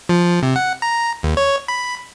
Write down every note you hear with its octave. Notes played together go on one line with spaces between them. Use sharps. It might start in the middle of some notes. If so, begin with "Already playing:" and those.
F3
C3
F#5
A#5
D#2
C#5
B5